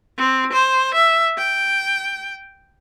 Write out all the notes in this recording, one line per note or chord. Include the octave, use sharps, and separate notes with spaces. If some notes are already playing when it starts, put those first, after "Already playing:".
C4
C5
E5
G5